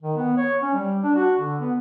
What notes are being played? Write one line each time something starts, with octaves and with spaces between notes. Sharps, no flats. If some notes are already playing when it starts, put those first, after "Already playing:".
D#3
B3
C#5
C#4
G3
D4
F#4
D3
B3